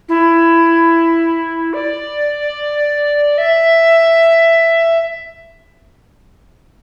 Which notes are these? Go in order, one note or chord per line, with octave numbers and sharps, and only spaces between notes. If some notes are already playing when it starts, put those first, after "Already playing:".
E4
D5
E5